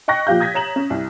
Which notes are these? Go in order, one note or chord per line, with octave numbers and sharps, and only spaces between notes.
D#5 G5 C#6 F#6 A#6
A#2 F3 G4 F5 G6
D#6 G#6 A#6 B6
C#5 A#5 E7 F#7
C#4
C2